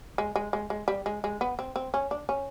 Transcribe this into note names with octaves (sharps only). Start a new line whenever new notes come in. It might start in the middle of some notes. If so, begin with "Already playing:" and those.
G#3
G#3
G#3
G#3
G3
G#3
G#3
B3
C4
C4
C#4
D4
C#4